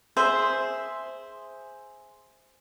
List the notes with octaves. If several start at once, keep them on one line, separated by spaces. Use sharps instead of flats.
G#4 C5 E5